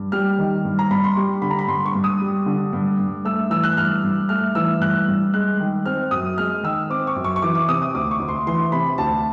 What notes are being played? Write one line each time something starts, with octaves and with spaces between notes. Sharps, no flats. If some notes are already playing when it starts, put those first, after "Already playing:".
Already playing: G2
G3 F6
D#3
G2
A#5
G2 B5
C6
G3 C#6
D3 B5
A#5
B5
G2 C6
C#6
G2
D#6
G3
D3
G2
G2
A3 E6
E3 E6
F#6
G2 F6
G2
A3 F6
E3 E6
G2 F#6
G2
G#3 F#6
D#3
C4 F6
F#2 D#6
G#3 F6
D#3 E6
C4 D6
C#6
F#2
C#6
C#6
E3 D6
D6
C3 D#6
D#6
D2 D6
C#6
D2
C6
E3 C6
C3 B5
D2 A5